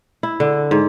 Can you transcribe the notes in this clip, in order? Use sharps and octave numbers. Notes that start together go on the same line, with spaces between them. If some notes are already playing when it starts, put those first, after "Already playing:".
E4
D3
G#2